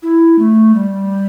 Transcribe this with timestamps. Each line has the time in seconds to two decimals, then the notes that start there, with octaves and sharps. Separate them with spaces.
0.03 E4
0.39 A3
0.74 G3